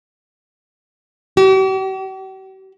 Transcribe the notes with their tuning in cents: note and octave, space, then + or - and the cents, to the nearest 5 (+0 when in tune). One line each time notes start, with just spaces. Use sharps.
G4 -45